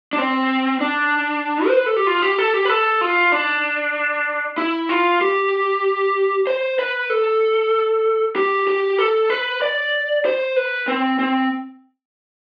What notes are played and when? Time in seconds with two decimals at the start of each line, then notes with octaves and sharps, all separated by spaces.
0.13 D4
0.18 C4
0.81 D4
1.67 C5
1.77 B4
1.86 A4
1.96 G4
2.07 F4
2.22 G4
2.39 A4
2.54 G4
2.65 B4
2.69 A4
3.01 F4
3.32 D4
4.58 E4
4.89 F4
5.21 G4
6.47 C5
6.79 B4
7.10 A4
8.36 G4
8.67 G4
8.99 A4
9.30 B4
9.62 D5
10.25 C5
10.56 B4
10.88 C4
11.19 C4